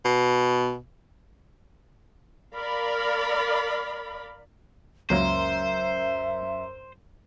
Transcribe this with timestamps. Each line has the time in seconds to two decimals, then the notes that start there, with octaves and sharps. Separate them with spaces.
0.05 B2
2.55 A#4 D5 F5 B5
5.10 C#2 F#2 F#3 A#3 C5 E5